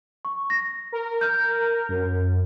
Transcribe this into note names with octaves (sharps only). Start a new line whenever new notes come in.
C#6
A#6
A#4
F6 G6
F#2